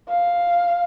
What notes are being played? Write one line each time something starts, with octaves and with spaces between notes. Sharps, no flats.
F5